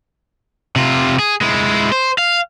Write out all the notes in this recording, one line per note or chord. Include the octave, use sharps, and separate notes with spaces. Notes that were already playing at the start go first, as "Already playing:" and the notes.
C3 F4
G#4
G#3 E4
C5
F5